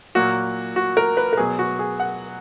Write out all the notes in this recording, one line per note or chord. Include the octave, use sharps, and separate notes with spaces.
A#2 F#3 A#3 F#4
F#4
A#4
B4
A#4
B2 F#3 B3 G#4
F#4
G#4
F#5